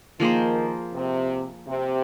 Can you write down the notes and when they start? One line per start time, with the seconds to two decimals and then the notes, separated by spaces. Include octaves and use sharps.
0.20 D#3 F3 A#3 G#4 C5
0.94 C3
1.67 C3